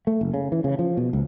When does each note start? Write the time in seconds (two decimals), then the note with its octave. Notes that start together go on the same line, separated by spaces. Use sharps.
0.07 A3
0.21 F#1
0.34 C#3
0.52 E3
0.64 C#3
0.79 F3
0.97 B2
1.13 C#2